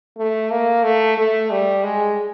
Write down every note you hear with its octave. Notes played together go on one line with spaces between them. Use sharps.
A3
A#3
A3
A3
G3
G#3